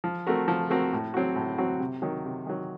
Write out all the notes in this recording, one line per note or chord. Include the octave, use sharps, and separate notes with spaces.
F3
A3 C4 F#4 A#4
F3
A3 C4 F#4 A#4
A2
F#3 C4 F#4
A2
F#3 C4 F#4
C3
D#3 F#3
C3
D#3 F#3